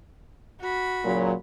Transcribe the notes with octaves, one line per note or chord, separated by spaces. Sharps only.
F#4 B5
A#2 C#3 F#3